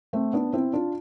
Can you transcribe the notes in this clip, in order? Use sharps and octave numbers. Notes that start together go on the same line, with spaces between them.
A3 C4
B3 D4
C4 E4
D4 F4